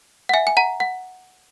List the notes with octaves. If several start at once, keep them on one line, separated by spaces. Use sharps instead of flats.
F#5
E5 G#5
G#5
F#5 A#5
F#5